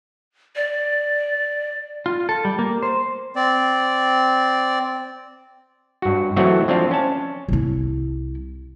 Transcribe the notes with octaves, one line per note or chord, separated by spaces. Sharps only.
D5
F4
A4
G3
A#3
C5
C4 D5
G2 F#4
E3 F#3 A3 C4 F#4
F3 C4 D4 F4 F5
C#4 A5
C2 E4